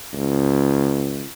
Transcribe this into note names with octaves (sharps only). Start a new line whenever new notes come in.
C#2